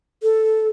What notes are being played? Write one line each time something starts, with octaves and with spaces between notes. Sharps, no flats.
A4